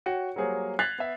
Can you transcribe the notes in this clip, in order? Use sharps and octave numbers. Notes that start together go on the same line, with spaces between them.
F#4 C#5 G5 C#7
F#3 G3 A#3 G#4 C5 C#5
F#6 G#6 A6 B6 C7 F7
B3 E5